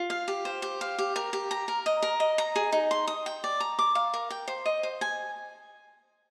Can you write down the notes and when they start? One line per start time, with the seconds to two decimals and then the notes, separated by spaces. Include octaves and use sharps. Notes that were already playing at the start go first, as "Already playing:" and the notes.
Already playing: F4
0.10 F5
0.28 G4
0.45 C5
0.62 G4
0.81 F5
0.99 G4
1.16 A#4
1.33 G4
1.51 A#5
1.68 A#4
1.86 D#5
2.02 A#4
2.20 D#5
2.38 A#5
2.56 G#4
2.72 D#4
2.91 C6
3.07 D#6
3.26 G5
3.44 D5
3.60 A#5
3.79 D6
3.95 F5
4.14 A#4
4.30 G5
4.48 C5
4.66 D#5
4.83 C5
5.01 G#5